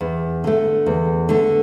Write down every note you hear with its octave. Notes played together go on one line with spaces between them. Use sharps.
E2
D3 A3
E2
D3 A3